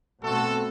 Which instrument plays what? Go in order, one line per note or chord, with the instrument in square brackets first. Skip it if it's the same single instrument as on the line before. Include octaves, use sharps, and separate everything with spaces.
[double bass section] B2 A3 C4 [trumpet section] F#4 A4